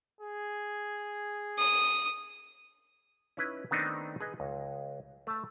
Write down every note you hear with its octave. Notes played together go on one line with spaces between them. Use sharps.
G#4
D#6
C#4 D#4 E4 B4
D#3 A3 B3 C4 D4 D#4
G#4 B4 D#5
C#2
A3 A5